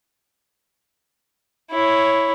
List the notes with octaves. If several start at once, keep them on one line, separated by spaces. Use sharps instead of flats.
E4 C#5